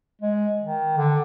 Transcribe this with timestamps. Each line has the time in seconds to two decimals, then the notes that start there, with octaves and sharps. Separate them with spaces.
0.22 G#3
0.62 D#3
0.98 D3